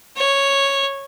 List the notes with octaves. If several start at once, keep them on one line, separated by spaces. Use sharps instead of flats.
C#5